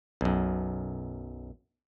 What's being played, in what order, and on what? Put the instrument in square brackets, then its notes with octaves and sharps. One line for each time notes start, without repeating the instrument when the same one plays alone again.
[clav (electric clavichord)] B1 F#2